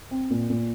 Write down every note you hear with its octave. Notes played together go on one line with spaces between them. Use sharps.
C4
A#2
A#2